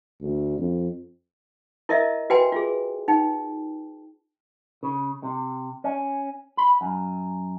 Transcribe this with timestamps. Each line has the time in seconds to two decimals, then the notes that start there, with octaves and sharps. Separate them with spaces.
0.21 D2
0.58 F2
1.89 E4 A#4 D#5 E5
2.30 F#4 B4 G5 G#5 B5
2.52 F4 G#4
3.08 D#4 G5
4.83 C#3
5.23 C3
5.84 C#4
6.57 B5
6.81 F#2